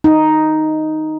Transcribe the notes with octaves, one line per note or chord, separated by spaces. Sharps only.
D#4